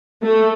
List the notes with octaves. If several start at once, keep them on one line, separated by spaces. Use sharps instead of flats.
A3